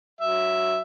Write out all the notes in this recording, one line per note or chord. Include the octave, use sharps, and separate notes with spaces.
F#3 E5